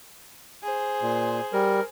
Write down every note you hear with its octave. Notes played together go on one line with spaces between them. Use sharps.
G#4 C5
A#2
G3 A#4